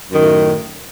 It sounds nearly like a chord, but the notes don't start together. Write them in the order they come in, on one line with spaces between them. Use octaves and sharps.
F#2 D#3 A2